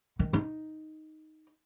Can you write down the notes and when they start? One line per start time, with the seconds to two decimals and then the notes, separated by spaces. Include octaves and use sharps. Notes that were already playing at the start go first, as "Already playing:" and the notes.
0.19 D#3
0.33 D#4